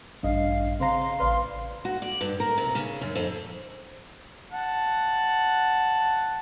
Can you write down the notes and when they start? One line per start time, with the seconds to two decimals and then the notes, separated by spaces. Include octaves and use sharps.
0.23 A1 G2 D4 D#5 F5
0.80 C#3 C4 C5 F5 A#5 C6
1.20 A1 B4 D5 F6
1.85 F#4
2.02 D5
2.21 G2
2.40 A#4
2.58 C3
2.75 C#3
3.01 F#2
3.15 F2
4.52 F#5 A5